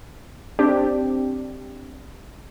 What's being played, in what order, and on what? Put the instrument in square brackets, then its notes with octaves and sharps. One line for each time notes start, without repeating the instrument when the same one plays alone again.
[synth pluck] C4 D4 G4